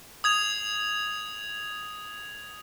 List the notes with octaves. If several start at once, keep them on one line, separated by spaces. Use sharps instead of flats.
D#6 G#6 F7